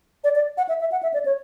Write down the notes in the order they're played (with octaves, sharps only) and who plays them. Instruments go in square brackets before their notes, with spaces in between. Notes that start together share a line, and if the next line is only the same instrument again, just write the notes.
[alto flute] D5
D5
F#5
E5
E5
F#5
E5
D5
C#5